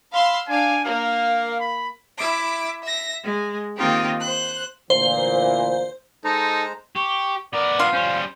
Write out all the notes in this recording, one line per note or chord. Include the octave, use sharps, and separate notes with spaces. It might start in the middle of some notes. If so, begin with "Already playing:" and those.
F5 B5 C6 E6
D4 D5 F5 G#5
A#3 F5
B5
E4 E5 D6
E5 A#6
G#3
D#3 A#3 C4 D#4 F4 G4
C5 F#6
D2 A#2 E3 C5
G#3 D#4 A4 C5 A#5
G4 C#6
B3 A#4 D5
F4
G3 C#4 C5